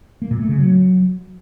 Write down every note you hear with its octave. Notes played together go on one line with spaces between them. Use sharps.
A#3
A#2
A3
C#3
F#3